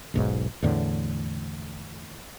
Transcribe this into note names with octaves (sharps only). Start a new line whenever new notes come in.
E1 B1 G#2
E2 A2 D3